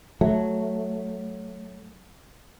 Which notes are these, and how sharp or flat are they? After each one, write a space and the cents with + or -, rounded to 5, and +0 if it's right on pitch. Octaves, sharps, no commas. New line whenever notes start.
F#3 +0 A3 +0